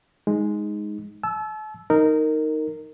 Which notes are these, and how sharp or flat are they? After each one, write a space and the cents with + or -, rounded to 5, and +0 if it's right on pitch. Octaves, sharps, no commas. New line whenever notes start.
G#3 +0 D#4 +5
A5 -40 E6 +0
D#4 +0 A#4 -15